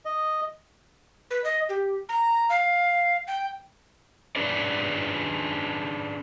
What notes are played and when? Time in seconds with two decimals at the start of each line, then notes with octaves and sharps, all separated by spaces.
0.05 D#5
1.31 B4
1.44 D#5
1.69 G4
2.09 A#5
2.50 F5
3.27 G5
4.36 C#4 D4 G#4 B4 D5